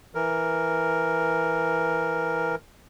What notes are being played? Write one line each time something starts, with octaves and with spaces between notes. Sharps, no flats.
E3 A#4